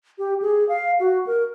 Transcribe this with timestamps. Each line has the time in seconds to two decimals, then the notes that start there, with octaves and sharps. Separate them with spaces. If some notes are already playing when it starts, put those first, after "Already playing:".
0.18 G4
0.42 G#4
0.69 F5
1.00 F#4
1.27 A#4